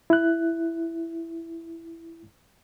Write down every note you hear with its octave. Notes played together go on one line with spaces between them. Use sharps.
E4 F#6